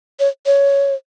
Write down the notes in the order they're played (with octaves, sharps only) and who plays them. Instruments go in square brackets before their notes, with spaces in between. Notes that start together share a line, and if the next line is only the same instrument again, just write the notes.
[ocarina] C#5
C#5